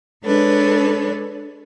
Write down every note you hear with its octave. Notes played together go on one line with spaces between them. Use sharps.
G#3 D4 A4 B4 C#5